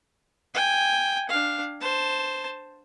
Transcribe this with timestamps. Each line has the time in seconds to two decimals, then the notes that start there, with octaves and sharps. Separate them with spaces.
0.54 G5 G#5
1.29 D4 F5
1.81 C5 A5